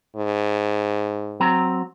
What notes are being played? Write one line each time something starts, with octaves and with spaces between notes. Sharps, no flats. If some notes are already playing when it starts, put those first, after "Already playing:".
G#2
F#3 C4 A#5